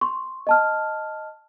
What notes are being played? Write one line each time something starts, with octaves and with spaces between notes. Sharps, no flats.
C6 C#6
D#5 A5 F6